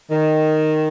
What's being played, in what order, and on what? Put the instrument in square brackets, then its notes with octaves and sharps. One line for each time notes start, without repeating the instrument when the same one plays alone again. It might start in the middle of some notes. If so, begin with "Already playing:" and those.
[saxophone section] D#3